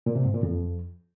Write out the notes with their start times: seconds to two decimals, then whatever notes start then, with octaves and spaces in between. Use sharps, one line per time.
0.06 A#2
0.15 C3
0.25 G#2
0.34 A#2
0.43 F2